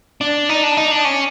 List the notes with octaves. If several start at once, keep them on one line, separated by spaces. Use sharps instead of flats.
D4
D#4
D4
D#4
D4
C#4